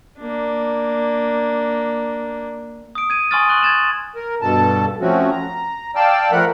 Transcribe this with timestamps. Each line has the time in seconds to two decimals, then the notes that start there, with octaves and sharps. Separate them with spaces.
0.19 A#3 D4
2.95 D#6 D7
3.10 G#6 D#7
3.31 G#5 C6 C#6 D#6 F6 A6
3.49 C#6 F#6 F#7
3.63 G#6 A6 E7
4.15 A#4
4.41 G2 B2 A4 A5
5.01 F3 A3 C4 C#4 F#4
5.31 A#5
5.95 D5 F5 G5 A5 E6
6.32 F3 A3 A#4 F#5 B5 F#6